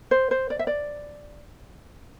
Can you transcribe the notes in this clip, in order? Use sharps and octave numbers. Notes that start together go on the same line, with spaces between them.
C5
C5
D5
E5
D5